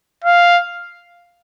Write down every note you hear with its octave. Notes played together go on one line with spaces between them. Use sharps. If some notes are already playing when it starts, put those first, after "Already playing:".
F5